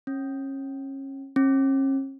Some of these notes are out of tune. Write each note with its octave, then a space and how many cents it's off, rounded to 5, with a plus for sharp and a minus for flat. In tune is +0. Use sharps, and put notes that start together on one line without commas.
C#4 -30
C#4 -45